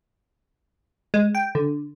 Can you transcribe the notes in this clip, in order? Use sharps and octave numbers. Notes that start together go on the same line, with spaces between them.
G#3
G5
D3